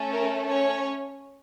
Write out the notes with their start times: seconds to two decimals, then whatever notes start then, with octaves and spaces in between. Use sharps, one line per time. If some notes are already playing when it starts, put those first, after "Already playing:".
Already playing: A3 C#4 A4
0.13 A#4
0.47 C#4 C#5